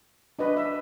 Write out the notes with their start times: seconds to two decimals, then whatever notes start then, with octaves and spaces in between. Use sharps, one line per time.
0.39 D4 F#4 B4 D#5
0.57 E5